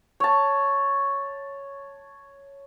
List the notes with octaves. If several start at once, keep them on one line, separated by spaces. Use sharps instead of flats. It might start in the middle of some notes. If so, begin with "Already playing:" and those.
C#5 A5